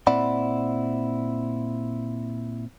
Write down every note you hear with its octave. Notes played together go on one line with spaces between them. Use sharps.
A#2 C4 E4 D5 F#5 B5